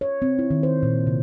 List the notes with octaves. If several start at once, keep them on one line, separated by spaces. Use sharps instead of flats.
C#5
C4
E4
D#3
C5
A#2
C3